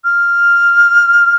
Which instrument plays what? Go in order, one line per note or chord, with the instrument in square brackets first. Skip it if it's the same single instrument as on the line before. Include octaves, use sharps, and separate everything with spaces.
[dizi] F6